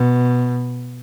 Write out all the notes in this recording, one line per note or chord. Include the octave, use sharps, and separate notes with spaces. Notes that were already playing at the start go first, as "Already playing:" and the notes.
Already playing: B2